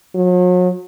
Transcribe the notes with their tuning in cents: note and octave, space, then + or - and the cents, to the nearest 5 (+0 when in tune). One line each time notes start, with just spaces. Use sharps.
F#3 -40